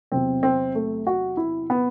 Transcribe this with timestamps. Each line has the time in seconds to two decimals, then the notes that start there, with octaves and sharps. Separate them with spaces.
0.12 E2 C3 F#3 C4
0.43 C4
0.75 A3
1.07 F#4
1.37 E4
1.70 B3